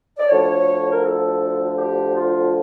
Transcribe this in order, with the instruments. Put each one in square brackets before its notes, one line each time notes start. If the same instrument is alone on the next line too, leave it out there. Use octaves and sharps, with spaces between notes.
[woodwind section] D5
D2 D3 F3 C#5
A#4
A4
G4
F4